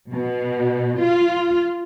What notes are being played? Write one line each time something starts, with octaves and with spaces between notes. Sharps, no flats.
B2
F4